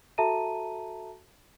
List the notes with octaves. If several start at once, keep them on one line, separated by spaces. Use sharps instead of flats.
F#4 A4 E5 A5 A#5 D#7